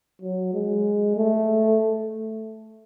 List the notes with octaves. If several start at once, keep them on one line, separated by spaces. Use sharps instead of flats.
F#3
G#3
A3